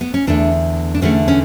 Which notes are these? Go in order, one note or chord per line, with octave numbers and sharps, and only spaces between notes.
B3
C#4
E2 D3 A3 D4
D4
E2 D3 A3 C#4
C#4